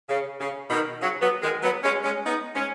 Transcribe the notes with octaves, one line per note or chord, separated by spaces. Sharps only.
C#3
C#3
B2 D#3
C#3 F#3
F#3 B3
D#3 G#3
F#3 B3
G#3 C#4
G#3 C#4
B3 D#4
G#3 C#4